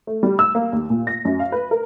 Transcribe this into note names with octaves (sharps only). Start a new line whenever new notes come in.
A3
G3
E6
A#3
D#2
A#2
A#6
F#2
F5
B4
A#4